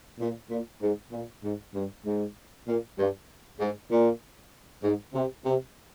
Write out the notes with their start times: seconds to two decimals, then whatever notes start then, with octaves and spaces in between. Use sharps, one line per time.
0.19 A#2
0.50 A#2
0.82 G#2
1.12 A#2
1.43 G#2
1.75 G2
2.04 G#2
2.67 A#2
2.98 G2
3.60 G#2
3.90 A#2
4.83 G#2
5.14 C3
5.45 C3